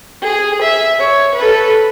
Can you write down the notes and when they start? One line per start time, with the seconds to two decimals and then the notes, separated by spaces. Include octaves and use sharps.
0.22 G#4
0.61 E5
0.99 C#5
1.35 A4 B4